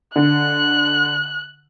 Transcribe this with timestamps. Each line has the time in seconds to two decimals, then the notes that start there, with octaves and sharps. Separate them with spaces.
0.16 D3 F#6